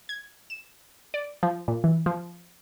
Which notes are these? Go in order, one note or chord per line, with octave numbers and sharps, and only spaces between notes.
G#6
E7
D5
F3
A#2
E3
F3